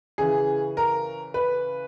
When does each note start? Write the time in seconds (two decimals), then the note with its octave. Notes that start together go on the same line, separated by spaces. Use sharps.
0.18 C#3 E3 G#4
0.77 A#4
1.34 B4